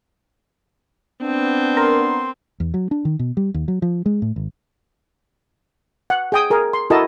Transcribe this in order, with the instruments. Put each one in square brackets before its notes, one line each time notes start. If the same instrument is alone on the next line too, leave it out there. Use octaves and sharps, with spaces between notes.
[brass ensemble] B3 D4 [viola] C4
[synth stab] A#4 [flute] C6
[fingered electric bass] E2
F#3
D4
D#3
B2
G3
D#2
F#3
F3
G#3
A2
G#1
[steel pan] F#5
G#4 G5 D#6
G#4 A#4
C6
E4 F#4 A4 A#4 D#5 A5